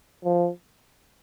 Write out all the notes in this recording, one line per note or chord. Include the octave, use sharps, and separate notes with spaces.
F3